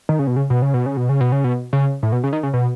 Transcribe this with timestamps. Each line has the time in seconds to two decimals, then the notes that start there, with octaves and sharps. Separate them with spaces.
0.09 D#3
0.19 C#3
0.27 B2
0.36 C#3
0.50 B2
0.62 C#3
0.74 B2
0.86 C#3
0.97 B2
1.09 C#3
1.21 B2
1.32 C#3
1.44 B2
1.73 C#3
2.03 A2
2.12 B2
2.24 C#3
2.33 D#3
2.43 C#3
2.53 B2